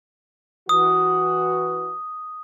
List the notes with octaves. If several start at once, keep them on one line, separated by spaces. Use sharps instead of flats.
E3 F#4 D#6